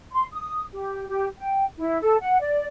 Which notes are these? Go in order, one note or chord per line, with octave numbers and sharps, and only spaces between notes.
C6
D#6
G4
G4
G5
E4
A4
F#5
D5